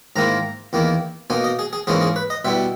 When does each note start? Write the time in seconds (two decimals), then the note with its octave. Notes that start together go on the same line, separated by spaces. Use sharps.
0.16 G#2 D#3 A#3 E4 A#5
0.73 E2 D#3 A#3 E4
1.30 B2 A#3 D#4 G#5
1.44 D#5
1.59 G#4
1.73 G#4
1.87 G#2 E3 A#3 C#4 E4 G#4
2.01 G#4
2.16 B4
2.30 D#5
2.45 B2 G3 B3 E4 E5